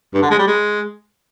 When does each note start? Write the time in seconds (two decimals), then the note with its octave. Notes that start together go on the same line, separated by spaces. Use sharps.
0.14 G2
0.22 D3
0.31 G#3
0.39 G3
0.47 G#3